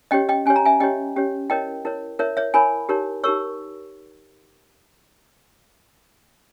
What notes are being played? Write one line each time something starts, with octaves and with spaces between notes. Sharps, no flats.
C#4 G4 C#5 D#5 G5
D#5 G5
C#4 G4 C#5 G#5
A#5
E5 G#5
C#4 G4 C#5 D#5 G5
C#4 G4 C#5
E4 A#4 C#5 D#5 G5
E4 A#4 C#5
E4 A#4 C#5 E5
C#5 E5
E4 A#4 C#5 G#5 B5
D#4 G4 A#4 C#5
D#4 G4 A#4 C#5 C#6 E6